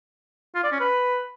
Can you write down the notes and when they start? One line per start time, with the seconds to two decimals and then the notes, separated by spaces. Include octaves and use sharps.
0.55 F4
0.64 D5
0.72 C#4
0.80 B4